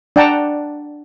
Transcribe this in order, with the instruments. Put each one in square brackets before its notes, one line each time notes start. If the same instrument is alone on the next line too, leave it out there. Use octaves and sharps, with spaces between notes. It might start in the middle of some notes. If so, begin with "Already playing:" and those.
[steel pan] D4 D5 F#5 G5 A5 A#5